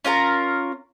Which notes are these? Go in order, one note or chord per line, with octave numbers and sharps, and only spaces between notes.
C#4 F4 A#4 A#5